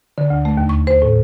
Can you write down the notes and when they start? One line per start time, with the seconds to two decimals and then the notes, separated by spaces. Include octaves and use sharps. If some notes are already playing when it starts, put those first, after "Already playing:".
0.18 D3
0.30 D2
0.45 A3
0.57 D#2
0.69 C#6
0.87 C5
1.02 A2